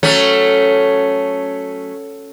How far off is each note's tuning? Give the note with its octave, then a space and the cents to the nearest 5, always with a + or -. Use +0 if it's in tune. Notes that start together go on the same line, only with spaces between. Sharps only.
F#3 +0 A3 +0 C#4 +0